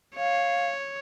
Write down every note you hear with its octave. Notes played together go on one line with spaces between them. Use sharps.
C#5 F5